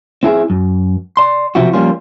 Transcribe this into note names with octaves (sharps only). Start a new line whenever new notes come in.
C4 E4 G#4
F#2
D5 C6
B1 C3 F3 C4 E4 F#4
F3 G3 A#3 C#4 F4